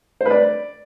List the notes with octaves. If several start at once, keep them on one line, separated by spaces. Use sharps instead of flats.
C5
B4
D5